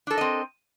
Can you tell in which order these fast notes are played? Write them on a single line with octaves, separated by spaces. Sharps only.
D4 A4 A#4 D#5 C4